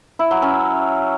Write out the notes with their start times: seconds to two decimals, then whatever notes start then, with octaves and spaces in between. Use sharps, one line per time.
0.19 E4
0.31 F#3
0.42 C#4